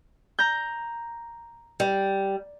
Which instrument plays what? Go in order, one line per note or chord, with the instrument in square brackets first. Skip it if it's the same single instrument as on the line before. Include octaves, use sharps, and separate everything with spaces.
[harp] A#5 G6
[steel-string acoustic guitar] G3